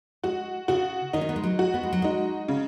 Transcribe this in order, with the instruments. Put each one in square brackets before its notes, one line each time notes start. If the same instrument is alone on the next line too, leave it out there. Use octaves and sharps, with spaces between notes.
[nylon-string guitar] G#3 [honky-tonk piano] F#4
[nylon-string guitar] C#3 [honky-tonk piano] F#4
[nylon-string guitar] D#3 [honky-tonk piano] D#4
[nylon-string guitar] C#4
B3
G#3
F#3
[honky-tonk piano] F#4
[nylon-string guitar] B3
G#3
F#3
[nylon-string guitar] G#3 [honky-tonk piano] D#4
[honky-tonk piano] C#3